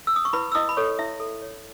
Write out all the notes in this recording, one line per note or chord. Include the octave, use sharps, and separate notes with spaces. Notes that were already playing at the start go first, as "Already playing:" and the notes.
E6
D#6
C#6
E4 B4 B5
E6
E4 D#5 D#6
B5
A4 C#5 C#6
E4 E5
A4
C#5